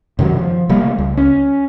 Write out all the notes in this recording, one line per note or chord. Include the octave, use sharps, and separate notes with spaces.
F#2 C3 D#3 F#3
F3
C3 G3 A3 A#3
C#2
C#4